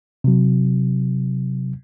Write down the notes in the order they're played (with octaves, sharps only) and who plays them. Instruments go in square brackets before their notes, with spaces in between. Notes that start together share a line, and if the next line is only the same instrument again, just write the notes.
[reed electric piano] C3 F#3